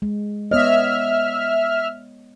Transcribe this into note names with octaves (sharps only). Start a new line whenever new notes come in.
G#3
B3 C#5 D#5 E5 F6